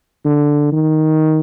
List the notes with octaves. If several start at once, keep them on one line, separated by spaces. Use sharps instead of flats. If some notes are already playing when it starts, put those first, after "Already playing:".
D3
D#3